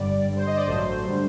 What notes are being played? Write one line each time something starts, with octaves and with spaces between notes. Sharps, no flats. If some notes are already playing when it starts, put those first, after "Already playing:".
Already playing: G1 G2 D3 G3 D5
G2 D3 G3
C5
D#5
D5
A1 G2 F#3 A3 C5
D3 G3